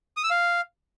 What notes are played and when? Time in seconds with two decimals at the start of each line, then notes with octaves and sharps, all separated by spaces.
0.17 D#6
0.24 E6
0.30 F5